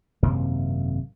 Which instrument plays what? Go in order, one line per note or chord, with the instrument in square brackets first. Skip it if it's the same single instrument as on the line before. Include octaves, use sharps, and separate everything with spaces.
[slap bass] G#1 F#2 C3 A#3